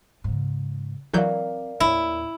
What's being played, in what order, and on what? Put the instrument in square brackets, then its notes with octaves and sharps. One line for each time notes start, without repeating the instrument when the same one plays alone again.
[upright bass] G#2 C#3
[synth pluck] E3 F#3 G6 [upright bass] C4 [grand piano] A#4 D5 F5
[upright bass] D#2 A2 [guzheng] E4